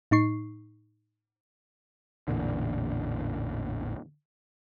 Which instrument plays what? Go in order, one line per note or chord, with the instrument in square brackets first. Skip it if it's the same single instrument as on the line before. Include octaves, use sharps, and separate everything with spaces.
[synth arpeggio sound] A2 D#4 C#6 C7
[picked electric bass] A1 E2 A#2 D3